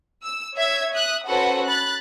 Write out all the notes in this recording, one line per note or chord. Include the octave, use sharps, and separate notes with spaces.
E6
C#5 E5 E6 G#6
E5 D#6 F#6
C#4 F#4 A4 B4 C5 F#5
B5 F#6 A6